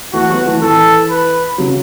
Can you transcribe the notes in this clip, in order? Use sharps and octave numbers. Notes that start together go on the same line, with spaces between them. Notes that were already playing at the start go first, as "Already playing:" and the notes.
E3 A3 F#4
F#3 B3
E3 A3
E3 A4
B4
C#3 F#3